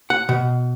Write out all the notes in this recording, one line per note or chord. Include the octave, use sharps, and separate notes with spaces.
F#5
B2